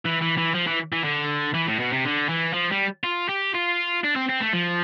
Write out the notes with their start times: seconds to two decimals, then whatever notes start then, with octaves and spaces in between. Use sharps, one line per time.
0.05 E3
0.21 E3
0.38 E3
0.55 F3
0.67 E3
0.92 E3
1.04 D3
1.55 E3
1.68 A2
1.80 B2
1.93 C3
2.05 D3
2.29 E3
2.54 F3
2.71 G3
3.04 F4
3.29 G4
3.54 F4
4.04 D4
4.16 C4
4.29 C4
4.41 A3
4.53 F3